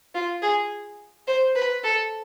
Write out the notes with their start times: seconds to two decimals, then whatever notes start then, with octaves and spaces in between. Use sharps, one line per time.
0.15 F4
0.42 G#4
1.27 C5
1.55 B4
1.84 A4